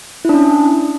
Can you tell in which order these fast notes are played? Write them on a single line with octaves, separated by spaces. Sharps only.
E4 D4 C#4